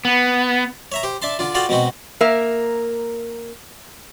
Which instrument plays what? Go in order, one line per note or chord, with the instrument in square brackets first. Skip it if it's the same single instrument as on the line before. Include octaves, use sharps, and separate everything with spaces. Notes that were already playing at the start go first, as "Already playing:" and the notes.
[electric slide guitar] B3
[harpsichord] C#5 E5 A#5
G4 C5
D4 E5 A5 C6
D3 D4 F4
F4 F#4 A4 D5 F5 G5
B2 G#3 C4 F#4
[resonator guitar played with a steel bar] A#3 A#4 E5